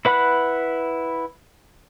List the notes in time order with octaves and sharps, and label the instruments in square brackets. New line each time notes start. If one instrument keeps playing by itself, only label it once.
[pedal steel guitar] E4 B4 F#5 B5 F#6